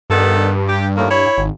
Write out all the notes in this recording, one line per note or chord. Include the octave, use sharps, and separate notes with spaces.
G2 D#3 B3 A4
G4
D#2 A2 A#3
E4 C#5
G#1